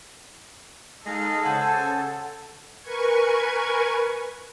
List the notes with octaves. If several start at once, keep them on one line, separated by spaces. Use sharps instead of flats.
G#3 D#4 G#4 A4 D#5 F5
C#3 C5 F#5 G#5 A5
A#4 B4 G#5 C#6 G#6